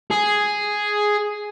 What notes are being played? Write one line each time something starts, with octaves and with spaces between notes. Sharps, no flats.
G#4